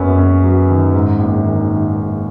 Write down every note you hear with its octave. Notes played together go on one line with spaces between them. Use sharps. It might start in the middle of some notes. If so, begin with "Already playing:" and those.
Already playing: F#1 F#2 F#3 B3 C#4
F#1 C#4
F#3
D#3
G#2
A#1
D#3
D#3
G#2